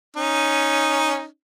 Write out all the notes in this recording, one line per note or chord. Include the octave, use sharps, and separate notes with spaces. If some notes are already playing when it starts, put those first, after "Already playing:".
C#4 D#4